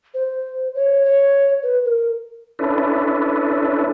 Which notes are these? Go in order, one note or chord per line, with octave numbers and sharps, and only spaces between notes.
C5
C#5
C#5
B4
A#4
C#4 D4 E4 A4 B4